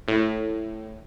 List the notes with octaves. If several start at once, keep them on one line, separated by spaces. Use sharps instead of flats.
A2